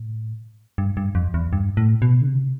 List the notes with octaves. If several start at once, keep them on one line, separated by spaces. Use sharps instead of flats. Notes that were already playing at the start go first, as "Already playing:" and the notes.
Already playing: A2
G2
G2
F2
E2
G2
A2
B2
D3
C3